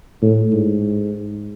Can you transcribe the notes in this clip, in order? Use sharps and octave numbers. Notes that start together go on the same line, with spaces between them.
A2
G#2